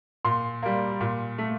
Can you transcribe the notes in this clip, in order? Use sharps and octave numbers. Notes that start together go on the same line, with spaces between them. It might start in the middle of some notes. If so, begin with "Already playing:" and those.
A#2 C6
G3 A#3
A#2
A3